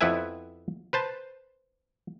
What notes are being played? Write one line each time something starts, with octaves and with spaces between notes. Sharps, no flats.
F2 B3 E4 B4 E5 G#5
B4 C5 A5